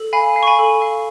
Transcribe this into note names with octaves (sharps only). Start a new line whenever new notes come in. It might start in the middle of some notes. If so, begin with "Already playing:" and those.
Already playing: A4
F5 G#5 B5
F5
C#6
G#5 B5
A4
F5